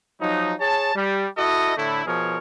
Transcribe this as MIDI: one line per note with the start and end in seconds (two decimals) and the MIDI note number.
0.21 0.53 53
0.21 0.53 54
0.21 0.53 63
0.60 0.91 68
0.60 0.91 73
0.60 0.91 81
0.96 1.26 55
1.37 1.76 64
1.37 1.76 66
1.37 1.76 69
1.37 1.76 75
1.77 2.02 45
1.77 2.02 50
1.77 2.02 57
1.77 2.02 64
2.06 2.37 47
2.06 2.37 53
2.06 2.37 68
2.06 2.37 70
2.06 2.37 73